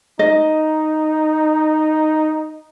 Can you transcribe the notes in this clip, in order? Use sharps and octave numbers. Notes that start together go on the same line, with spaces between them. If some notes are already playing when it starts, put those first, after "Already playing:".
D#4 D#5